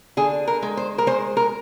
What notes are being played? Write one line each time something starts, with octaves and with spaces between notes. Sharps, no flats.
D3 G#4
A#4
G#3
C5
A#4
G#3 C5
A#4